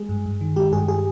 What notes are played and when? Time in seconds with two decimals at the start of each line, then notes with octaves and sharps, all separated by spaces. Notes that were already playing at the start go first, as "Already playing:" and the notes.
Already playing: G#3 G#4
0.09 G2
0.26 G2
0.41 D#3
0.56 G#3 G4
0.72 G2 G#4
0.88 G#4